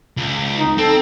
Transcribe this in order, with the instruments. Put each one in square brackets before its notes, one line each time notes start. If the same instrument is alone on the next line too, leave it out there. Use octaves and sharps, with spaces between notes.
[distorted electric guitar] C#2
[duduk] D#4
[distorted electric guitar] C4 [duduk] A4